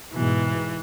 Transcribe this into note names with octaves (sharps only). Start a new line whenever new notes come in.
G#2 B2 E3